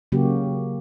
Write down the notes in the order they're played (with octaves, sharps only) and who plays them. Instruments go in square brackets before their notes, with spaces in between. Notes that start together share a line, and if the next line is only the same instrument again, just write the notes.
[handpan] C#3 F#3 A#3 F#4 G4